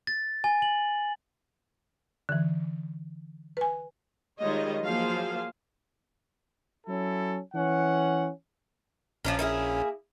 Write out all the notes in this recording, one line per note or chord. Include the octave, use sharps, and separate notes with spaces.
A6
G#5
F#7
D3 E3
B4 G#5
D#3 G3 G#3 F4 C#5 D#5
F3 F#3 A#3 G#4 C5 F5
F#3 C#4 E4 A4
E3 C#4 F#5
A#1 F3 C#4 D4 A#4
A#3 E4 G#4